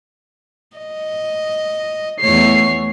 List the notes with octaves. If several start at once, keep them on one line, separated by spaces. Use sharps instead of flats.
D#5
E2 A3 C#5 C7